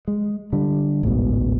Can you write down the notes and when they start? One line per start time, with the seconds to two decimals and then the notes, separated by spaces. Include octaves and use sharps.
0.08 G#3
0.53 D3 G3
1.03 A1 D2 G#2 B2